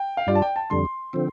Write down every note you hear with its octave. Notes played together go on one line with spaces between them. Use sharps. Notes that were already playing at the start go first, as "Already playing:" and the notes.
Already playing: G5
F5
G2 G3 F4 D5
A5
G5
A5
F2 D3 G3 C6
D3 F3 C4